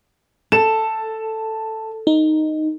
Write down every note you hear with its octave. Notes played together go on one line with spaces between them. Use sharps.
A4 A5 E7
D#4